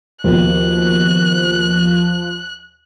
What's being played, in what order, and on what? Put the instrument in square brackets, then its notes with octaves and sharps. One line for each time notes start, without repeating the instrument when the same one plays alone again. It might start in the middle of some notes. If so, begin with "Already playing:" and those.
[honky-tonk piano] D#2 B2 [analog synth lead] F3 [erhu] F#6